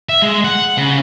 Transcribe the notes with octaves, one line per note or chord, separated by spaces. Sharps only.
E5
G#3
F#5
C#3